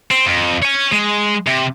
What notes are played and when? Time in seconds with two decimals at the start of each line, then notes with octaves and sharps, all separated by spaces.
0.11 C4
0.26 F2
0.62 C#5 G#5
0.92 G#3
1.47 C3